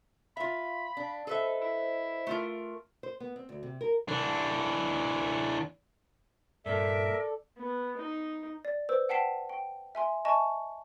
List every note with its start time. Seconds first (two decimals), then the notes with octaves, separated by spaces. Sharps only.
0.37 F4 E5 F5 B5
0.97 D4
1.27 A4 B4 C5 D#5 E5
1.62 E4
2.27 A3 F4 A#4
3.03 C5
3.20 B3
3.36 C4
3.49 D2
3.63 C3
3.81 A#4
4.08 E3 D4
6.66 G2 A#2 A4 A#4 D5 E5
7.58 B3
7.97 D#4
8.65 D5
8.89 B4 C5 E6
9.09 F#5 G5 A5 B6 C7 E7
9.49 G5
9.95 E5 G#5 C6
10.25 D#5 E5 G#5 A5 C#6